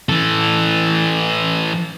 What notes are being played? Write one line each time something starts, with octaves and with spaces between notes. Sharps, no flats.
E3 A4